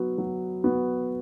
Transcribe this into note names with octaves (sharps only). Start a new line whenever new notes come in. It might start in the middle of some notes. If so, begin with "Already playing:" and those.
Already playing: F#3 B3 F#4
F#3
B3 F#4